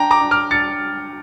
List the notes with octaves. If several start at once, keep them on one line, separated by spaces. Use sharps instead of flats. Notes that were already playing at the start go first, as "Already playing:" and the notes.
Already playing: D4 G5 A#5
A#5 D6
D4
D6 F6
D4 A6 C#7